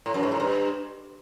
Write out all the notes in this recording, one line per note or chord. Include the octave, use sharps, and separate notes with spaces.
A2
F#2
G#2
A2
G2